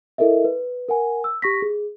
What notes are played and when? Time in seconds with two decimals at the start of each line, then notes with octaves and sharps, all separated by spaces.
0.18 E4 A4 A#4 D#5 E5
0.45 B4
0.88 A#4 F#5 G#5
1.24 E6
1.42 G4 C#6 A#6 B6
1.62 G#4